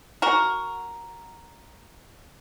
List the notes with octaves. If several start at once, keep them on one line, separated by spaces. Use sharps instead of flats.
F#4 A#4